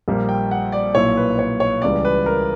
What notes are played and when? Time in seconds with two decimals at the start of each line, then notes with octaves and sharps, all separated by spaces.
0.08 A#1 A#2 G3 A#3
0.29 G5
0.51 F#5
0.72 D5
0.95 B1 A#2 A#3 E4 C#5
1.17 B4
1.39 C#5
1.60 C#5
1.82 C#2 C#3 E3 G3 D5
2.05 B4
2.26 A#4